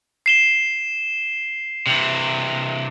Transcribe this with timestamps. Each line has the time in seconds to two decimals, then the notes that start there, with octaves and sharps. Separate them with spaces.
0.26 C7 E7 G7
1.86 C3 E3